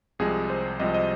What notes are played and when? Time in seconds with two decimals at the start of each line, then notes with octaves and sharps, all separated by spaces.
0.19 C2 C3 F3 G#3 G#4
0.50 C5
0.80 C2 C3 F3 G#3 D#5
0.94 D#5